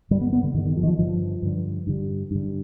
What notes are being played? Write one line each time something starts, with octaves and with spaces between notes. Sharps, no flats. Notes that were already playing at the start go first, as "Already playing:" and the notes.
G2 D3 G3
B3
B3
D3
G2 D3 D#3
D#3
F3
D#3
F3
G2 D3 F3
G2 D3
G2 D3
G2 D3